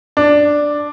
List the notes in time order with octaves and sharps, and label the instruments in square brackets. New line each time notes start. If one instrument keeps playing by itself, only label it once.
[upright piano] D4